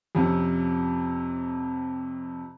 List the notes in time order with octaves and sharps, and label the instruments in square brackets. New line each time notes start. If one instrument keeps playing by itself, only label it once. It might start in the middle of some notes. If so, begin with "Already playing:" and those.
[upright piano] F2 C3 C#4